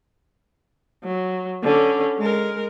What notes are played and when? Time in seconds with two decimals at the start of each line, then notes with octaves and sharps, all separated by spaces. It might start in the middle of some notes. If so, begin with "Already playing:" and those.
1.04 F#3
1.63 D3 C#4
2.18 G#3 A#4